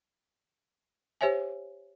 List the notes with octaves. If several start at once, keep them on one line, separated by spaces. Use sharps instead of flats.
G4 C5 C#5 E5 G#5